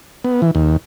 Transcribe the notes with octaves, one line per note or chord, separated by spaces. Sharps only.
B3
E3
D#2